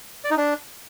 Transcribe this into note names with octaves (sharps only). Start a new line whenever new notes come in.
D5
D#4
D4